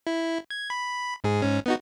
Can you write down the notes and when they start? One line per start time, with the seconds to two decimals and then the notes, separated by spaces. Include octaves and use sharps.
0.07 E4
0.50 G#6
0.70 B5
1.24 G#2 G#4
1.42 G#2 C#4
1.66 B3 D#4 F#4